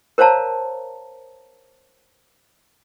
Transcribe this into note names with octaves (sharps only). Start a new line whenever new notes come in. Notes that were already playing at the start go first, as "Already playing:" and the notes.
A#4 C5 C#5 F5 A5 A#5